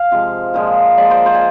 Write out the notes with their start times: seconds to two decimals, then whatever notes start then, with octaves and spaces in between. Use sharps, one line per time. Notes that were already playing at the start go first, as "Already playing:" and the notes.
Already playing: F5
0.11 C3 F3 G#3
0.54 A#2 F3 G#3
0.97 A#2 F3 G#3 D5
1.11 C5
1.26 C5
1.35 G#5